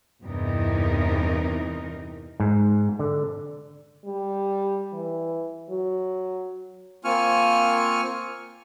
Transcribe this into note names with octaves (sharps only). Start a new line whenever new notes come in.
E2 G2 C3 E3 D#4 A#4
G#2
D3
G3
E3
F#3
A#3 C4 F4 G#5 C#6 F6